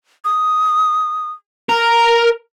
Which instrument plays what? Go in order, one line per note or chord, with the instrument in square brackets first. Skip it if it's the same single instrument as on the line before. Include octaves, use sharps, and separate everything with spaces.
[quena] D#6
[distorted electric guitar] A#4 [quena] A#5